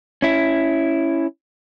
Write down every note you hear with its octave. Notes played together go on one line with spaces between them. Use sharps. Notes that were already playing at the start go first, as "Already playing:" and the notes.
C#4 E4